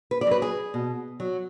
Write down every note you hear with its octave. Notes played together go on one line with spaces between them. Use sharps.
B4
D5
F#3 B4
G#4
B2
F#3